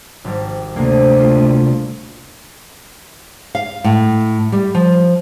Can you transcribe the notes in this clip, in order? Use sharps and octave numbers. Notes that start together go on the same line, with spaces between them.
G#1 G3
D2 C3 A#3
F4
F5
A2
G3
F3